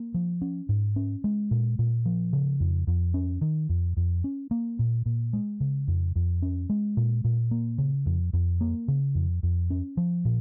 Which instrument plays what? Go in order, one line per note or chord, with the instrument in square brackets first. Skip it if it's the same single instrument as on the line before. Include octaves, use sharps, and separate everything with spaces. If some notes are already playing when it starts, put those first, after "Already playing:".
Already playing: [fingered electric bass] A#3
F3
C#4
G#2
C#4
G#3
A#2
A#2
F3
C#3
F2
F2
C#4
D#3
F2
F2
C#4
A#3
A#2
A#2
G#3
C#3
F2
F2
C#4
G#3
A#2
A#2
A#3
C#3
F2
F2
A#3
C#3
F2
F2
C#4
F3
A#2